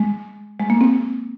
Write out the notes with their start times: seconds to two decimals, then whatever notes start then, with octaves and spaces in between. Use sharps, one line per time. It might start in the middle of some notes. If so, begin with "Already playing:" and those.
Already playing: G#3
0.60 G#3
0.70 A#3
0.81 C4